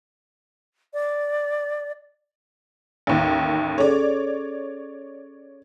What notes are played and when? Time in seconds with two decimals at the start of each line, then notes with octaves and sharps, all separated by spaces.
0.93 D5
3.07 A1 D#2 D#3
3.78 C#4 G#4 A4 C#5 D5